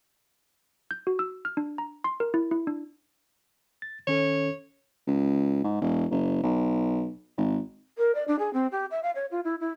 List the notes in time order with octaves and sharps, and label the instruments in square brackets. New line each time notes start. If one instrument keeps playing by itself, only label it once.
[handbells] G6
F#4
E6
F6
D4
A#5
C6
A#4
E4
E4
D4
[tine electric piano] A6
[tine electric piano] D#3 C#4 A4 [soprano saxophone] C#5
[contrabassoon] C#2
G#2
E1
F#1
B1
G#1
[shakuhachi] A#4
D5
D4
G#4
C4
G4
E5
F5
C#5
F4
E4
E4